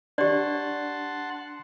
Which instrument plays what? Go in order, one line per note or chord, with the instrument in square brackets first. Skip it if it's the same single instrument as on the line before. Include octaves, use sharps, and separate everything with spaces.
[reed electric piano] D4 [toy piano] G4 D5 [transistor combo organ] F#5 A5 C6